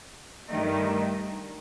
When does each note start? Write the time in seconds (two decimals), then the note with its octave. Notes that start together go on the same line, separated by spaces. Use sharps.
0.47 G2 D#3 A3